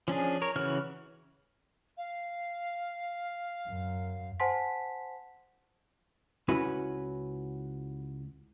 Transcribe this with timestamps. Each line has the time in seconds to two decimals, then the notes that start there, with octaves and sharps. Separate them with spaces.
0.08 F3 C#4 D4 G#4
0.42 A#4 C#5
0.56 C#3 E3 F#4 C#5 F6
1.97 F5
3.69 F#2
4.40 C5 F#5 G#5 A5 C6 B6
6.48 C#2 C#4 E4 F#4 B4